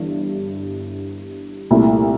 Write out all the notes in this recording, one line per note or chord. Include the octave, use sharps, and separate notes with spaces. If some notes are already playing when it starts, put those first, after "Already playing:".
Already playing: G1 G2 E3 G3
C2 A#2 A3 E4